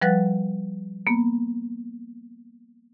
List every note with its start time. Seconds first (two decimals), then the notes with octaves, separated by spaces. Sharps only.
0.02 F3 G3 B4 F#5 F#6 A6
1.07 A#3 B3